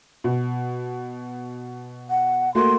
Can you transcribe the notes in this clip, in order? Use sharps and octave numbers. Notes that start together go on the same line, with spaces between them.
B2
F#5
A3 A#3 F#4 C6